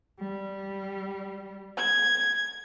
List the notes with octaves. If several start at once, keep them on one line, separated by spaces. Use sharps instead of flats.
G3
G#6